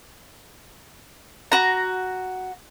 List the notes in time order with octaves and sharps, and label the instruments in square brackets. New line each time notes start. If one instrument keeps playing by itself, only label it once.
[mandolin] F#4 A#5